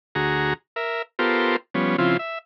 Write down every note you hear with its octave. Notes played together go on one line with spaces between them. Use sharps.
D2 F#4 G#4 A#5
A#4 E5
B3 F4 G4 A4 A#4 C5
F3 G3 B3 C#4
C#3 F3 C4 E4 F4
E5